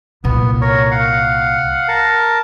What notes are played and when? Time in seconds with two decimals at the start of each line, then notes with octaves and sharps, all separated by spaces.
0.24 C2 A#2 B3
0.61 A#4 C#5
0.91 F5 F#5
1.88 A#4 A5